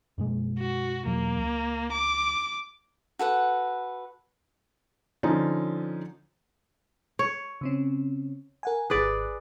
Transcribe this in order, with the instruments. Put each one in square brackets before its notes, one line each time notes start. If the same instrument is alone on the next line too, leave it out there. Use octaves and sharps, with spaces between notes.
[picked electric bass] F#2 B2 G#3
[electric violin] F#4
[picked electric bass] E2 B2 F#3 [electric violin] A#3
[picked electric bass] C#2
[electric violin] D6
[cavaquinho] F#4 A4 B4 F#5
[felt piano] D3 F3 C#4 D#4
[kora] C#5
[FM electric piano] C#3 C4 C#4
A#4 F#5 G#5
[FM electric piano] G#1 F#6 [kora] G#4 B4 D5